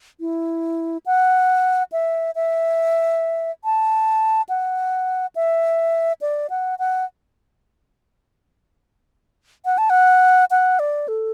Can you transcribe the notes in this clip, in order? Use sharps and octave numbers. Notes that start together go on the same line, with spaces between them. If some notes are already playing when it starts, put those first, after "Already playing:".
E4
F#5
E5
E5
A5
F#5
E5
D5
F#5
F#5
F#5
A5
F#5
F#5
D5
A4